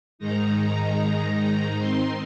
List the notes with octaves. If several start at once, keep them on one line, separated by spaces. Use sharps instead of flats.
G#2 D#3 G#3 D#4 A#5
A#5
A#5
D#3 C4 D#4 C6